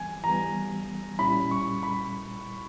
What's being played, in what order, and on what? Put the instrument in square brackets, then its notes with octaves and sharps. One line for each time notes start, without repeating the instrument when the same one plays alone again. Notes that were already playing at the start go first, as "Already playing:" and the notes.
Already playing: [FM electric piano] E3 G3 B3 [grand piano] G#5
[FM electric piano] E3 G3 B3 [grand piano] A#5
[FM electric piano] A#2 G3 C#4 E4 [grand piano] B5
[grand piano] C#6
B5